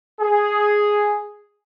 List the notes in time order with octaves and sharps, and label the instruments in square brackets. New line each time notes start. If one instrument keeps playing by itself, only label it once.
[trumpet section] G#4